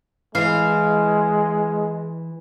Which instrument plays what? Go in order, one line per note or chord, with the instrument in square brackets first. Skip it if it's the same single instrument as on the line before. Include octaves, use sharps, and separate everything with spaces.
[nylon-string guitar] E3 [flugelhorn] G#3 [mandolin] F5